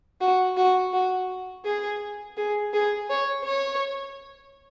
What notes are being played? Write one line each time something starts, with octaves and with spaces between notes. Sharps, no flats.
F#4
F#4
F#4
G#4
G#4
G#4
C#5
C#5